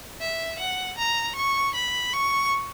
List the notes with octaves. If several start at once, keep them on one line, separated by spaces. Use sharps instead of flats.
E5
F#5
A#5
C#6
B5
C#6